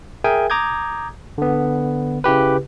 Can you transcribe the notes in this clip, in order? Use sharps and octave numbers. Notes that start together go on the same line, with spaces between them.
G#4 A#4 E5 G5 G#5
A#5 D6 D#6 G6 G#6
D3 B3
C#3 E4 G4 B4